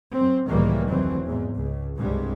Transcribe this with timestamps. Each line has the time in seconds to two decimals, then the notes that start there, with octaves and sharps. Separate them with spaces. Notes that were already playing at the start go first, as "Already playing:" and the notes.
0.12 F#2 C4
0.48 C#2 A2 D#3 E3 G3 A#3
0.86 F1 D2 E3 F#3 C4
1.23 E2 G#2
1.55 C#2
1.97 C2 G2 G3 G#3